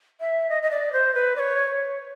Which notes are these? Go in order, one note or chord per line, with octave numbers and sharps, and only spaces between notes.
E5
D#5
D#5
D5
C5
B4
D5
C#5